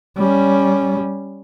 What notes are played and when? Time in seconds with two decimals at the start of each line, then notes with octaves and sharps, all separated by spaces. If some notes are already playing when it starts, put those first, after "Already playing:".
0.17 G3 C#4